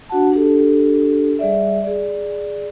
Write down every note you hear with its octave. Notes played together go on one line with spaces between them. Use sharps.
D4 F#4 F#5 A5
D4 G4 A4
G3 G#4 D5 E5
G#4 D5